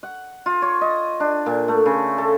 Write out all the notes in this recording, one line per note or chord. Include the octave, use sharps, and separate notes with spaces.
F#5
F4
C#5
D#5
D4
A#2
A3
C#3
A4